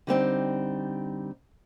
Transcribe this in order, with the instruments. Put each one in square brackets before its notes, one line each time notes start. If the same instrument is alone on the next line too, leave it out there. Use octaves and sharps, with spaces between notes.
[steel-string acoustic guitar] D3 G3 C4 D#4